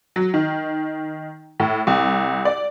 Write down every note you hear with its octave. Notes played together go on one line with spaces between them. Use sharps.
F#3
D#3
A2
C2
D5